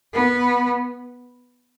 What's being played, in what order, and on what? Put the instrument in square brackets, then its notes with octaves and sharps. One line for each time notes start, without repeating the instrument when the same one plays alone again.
[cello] B3